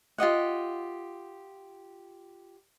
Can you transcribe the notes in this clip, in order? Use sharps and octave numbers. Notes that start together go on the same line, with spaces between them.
F4 G4 D#5 F#5